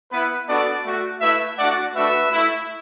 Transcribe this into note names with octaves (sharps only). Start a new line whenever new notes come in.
B3 E4 B4
B3 D4 F#4 A4 D5
A3 F#4
A3 E4 B4 E5
A3 D4 F#4 D5 F#5
A3 D4 F#4 B4 E5
A3 E4